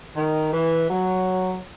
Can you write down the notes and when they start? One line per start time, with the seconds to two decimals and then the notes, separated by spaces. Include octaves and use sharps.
0.16 D#3
0.53 E3
0.90 F#3